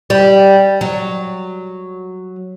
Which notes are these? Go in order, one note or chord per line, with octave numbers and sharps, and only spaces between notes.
G3
F#3